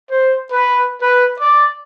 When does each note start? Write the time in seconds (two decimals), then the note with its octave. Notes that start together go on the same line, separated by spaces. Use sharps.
0.10 C5
0.52 B4
1.02 B4
1.39 D5